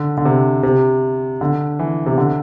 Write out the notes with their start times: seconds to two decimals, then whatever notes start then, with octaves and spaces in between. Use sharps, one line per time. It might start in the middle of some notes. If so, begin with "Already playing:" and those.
Already playing: D3
0.17 D3
0.25 C3
0.63 C3
1.41 D3
1.79 E3
2.06 C3
2.18 D3